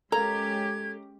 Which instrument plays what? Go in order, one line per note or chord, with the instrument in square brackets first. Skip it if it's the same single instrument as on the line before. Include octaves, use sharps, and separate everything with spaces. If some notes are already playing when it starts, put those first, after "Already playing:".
[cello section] G#3 C#4 G4 [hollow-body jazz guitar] A4 A#4 F5 [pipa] A#5 [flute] G#6